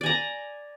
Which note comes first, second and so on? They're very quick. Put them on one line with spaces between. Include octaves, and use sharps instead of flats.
D5 G#5 A#5